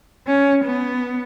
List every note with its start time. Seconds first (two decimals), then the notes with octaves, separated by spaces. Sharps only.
0.27 C#4
0.64 B3